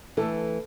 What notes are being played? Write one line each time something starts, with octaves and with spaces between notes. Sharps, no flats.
E3 A3 A4